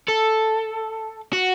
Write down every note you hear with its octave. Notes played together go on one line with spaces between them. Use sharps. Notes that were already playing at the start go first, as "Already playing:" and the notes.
A4
F#4